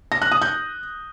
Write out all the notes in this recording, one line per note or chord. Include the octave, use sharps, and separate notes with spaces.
A#6
F#6
D#6
G6